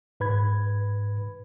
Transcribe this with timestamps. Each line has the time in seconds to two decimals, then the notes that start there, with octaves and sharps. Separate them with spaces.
0.20 G#2 B4 B5 G#6